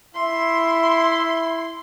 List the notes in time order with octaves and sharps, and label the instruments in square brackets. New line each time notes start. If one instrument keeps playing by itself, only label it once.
[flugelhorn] E4 [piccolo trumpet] E5 [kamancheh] C6